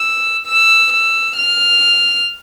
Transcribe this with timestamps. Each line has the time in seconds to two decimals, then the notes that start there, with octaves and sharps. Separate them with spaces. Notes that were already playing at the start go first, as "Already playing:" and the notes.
Already playing: E6
0.47 E6
0.93 E6
1.38 F6